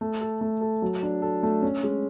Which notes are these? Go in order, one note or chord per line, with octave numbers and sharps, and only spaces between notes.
A3
A4
A3
A4
F#3
D4
A4
A3
C#4
G#3